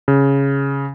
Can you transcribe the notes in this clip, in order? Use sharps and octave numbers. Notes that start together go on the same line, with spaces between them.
C#3